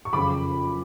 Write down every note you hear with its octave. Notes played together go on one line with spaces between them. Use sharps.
C#6
F#1 F2 C#3 F3 B5 D6